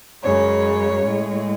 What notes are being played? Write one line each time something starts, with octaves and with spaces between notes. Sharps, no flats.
F#2 C#3 G#3 C#5
A2 G#3